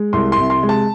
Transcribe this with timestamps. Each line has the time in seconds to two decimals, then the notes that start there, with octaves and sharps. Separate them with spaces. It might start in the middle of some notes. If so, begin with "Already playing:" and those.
Already playing: G#3
0.13 C2 C6
0.32 C6
0.38 C3
0.50 C6
0.63 G#3
0.69 A5